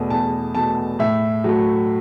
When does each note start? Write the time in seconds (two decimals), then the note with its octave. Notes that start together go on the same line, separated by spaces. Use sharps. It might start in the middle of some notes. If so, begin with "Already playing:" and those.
Already playing: E2 B2 A3
0.10 E2 A5
0.55 B2 A3 A5
0.99 A2 E5
1.44 F#3 A3